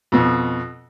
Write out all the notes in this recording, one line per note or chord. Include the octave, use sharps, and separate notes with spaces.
F2 B2